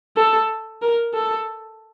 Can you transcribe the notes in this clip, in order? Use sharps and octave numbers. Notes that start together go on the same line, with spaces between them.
A4
A#4
A4